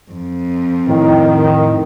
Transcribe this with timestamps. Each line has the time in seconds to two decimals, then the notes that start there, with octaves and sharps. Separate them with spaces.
0.12 F2
0.88 A2 D#3